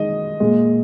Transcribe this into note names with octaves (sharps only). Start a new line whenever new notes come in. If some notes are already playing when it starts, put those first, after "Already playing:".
Already playing: D#3 G#3 D#5
A#2 G#3